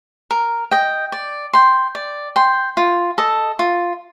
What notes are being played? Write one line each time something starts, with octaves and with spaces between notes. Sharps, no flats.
A#4
D#5 G5
D5
G5 C6
D5
G5 C6
F4
A4 D#5
F4